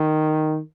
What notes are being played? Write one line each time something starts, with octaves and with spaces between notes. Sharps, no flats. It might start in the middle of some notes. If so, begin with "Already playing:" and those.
Already playing: D#3